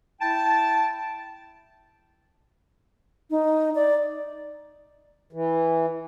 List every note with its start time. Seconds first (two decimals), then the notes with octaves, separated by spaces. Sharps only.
0.21 E4 G5 A5
3.30 D#4
3.75 D5
5.33 E3